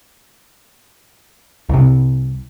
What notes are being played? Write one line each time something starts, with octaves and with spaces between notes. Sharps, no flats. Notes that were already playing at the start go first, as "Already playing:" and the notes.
C2 C3